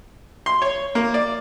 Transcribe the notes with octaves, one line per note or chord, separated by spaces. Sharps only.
C6
C#5
A#3
D5